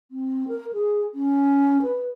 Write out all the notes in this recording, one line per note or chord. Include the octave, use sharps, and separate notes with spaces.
C4
A#4
G#4
C#4
B4